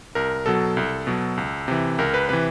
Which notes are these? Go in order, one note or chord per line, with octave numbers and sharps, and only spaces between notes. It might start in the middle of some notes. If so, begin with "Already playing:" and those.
C2 A#4
B2 F#3 A4
C2
B2 F#3
C#2
C3 E3
C#2 A#4
B4
C3 E3 B4